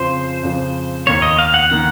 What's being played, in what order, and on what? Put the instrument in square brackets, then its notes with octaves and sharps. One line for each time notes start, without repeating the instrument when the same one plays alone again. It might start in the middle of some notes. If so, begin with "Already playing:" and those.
Already playing: [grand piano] F2 C#3 F3 [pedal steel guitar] C5
[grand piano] F2 C#3 F3
[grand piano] D#2 D#3 A#3 [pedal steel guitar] C#5
[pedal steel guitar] D#5
F5
F#5
[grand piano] D#3 A#3 [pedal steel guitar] F#5